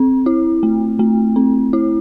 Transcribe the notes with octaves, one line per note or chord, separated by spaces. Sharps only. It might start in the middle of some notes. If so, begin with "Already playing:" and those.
Already playing: C4
E4
A3
A3
C4
E4